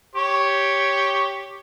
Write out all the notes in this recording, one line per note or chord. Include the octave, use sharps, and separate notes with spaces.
G4 C#5